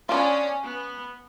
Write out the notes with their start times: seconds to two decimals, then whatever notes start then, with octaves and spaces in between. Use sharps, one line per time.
0.09 B3 C#4 D4 F4
0.63 B3